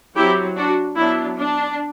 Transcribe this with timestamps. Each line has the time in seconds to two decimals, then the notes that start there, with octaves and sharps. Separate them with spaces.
0.16 F#3 C4 E4 G4
0.57 D4 F#4
0.96 F#3 B3 D4 E4
1.37 D4